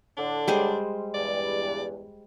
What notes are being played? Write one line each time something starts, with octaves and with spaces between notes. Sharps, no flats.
A2 D3 D4
G3 G#3 C5
E2 G2 D5